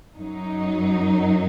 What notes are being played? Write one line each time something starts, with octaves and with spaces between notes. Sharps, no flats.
F#2 F#3 D#4